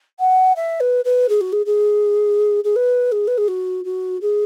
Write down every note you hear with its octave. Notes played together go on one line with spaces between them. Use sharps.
F#5
E5
B4
B4
G#4
F#4
G#4
G#4
G#4
B4
G#4
B4
G#4
F#4
F#4
G#4